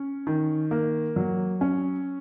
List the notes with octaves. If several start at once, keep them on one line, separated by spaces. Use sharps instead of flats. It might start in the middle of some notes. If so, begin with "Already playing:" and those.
Already playing: C#4
D#3
A#3
F#3
C#4